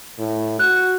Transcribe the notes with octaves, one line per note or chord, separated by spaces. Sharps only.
A2
F#4 F#6